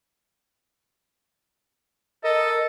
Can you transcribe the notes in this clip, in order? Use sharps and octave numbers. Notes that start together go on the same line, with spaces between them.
A4 A#4 D#5